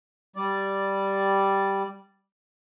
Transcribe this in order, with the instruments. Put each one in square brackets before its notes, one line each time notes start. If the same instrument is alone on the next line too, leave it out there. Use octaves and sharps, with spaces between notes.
[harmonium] G3 D5